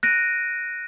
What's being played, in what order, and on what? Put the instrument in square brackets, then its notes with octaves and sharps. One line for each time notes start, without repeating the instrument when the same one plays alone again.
[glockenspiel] F#6 A#6 D7 D#7